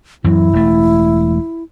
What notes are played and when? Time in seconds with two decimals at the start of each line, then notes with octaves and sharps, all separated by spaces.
0.24 F#2 E3 F#3 E4
0.53 E1 A3